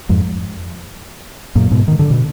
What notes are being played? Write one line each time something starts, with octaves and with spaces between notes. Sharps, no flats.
F2 G#2
F#2 A#2
G#2 B2
D#3
D3
B2